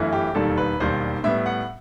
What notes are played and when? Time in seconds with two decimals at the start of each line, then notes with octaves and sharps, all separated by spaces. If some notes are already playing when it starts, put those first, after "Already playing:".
Already playing: G1 F#2 E3 A3 E4
0.12 G4
0.35 E1 D#2 D#3 G3 A4
0.57 B4
0.80 E1 D#2 D#3 G3 C5
1.24 A2 G3 B3 E5
1.46 F#5